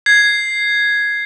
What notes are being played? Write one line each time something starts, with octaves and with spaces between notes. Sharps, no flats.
G#6 C7